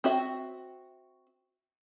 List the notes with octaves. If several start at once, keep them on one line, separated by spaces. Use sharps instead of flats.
C4 F#4 E5